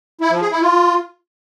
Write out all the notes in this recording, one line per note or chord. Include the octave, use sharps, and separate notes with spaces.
E4
F3
G#4
E4
F4